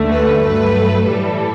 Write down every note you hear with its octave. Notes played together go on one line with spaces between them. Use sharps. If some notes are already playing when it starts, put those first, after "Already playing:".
Already playing: D2 D3 A3
B4
G2 F#3 A3 B4
A2 E3 G3 A4